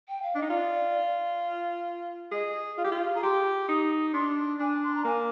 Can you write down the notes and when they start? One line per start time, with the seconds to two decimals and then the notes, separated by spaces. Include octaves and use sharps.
0.08 G5
0.22 F5
0.35 D4 D#5
0.42 D#4
0.50 F4 D5
2.32 G#4 D#5
2.78 F4
2.84 G4
2.92 F4
3.15 G#4 A#5
3.23 G4 C6
3.69 D#4 D#6
4.14 D4 C6
4.60 D4 G#5
4.84 C6
4.95 A#5
5.05 A#3 G#5